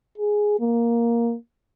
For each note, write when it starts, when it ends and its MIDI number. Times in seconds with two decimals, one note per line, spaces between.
0.18 0.58 68
0.60 1.35 58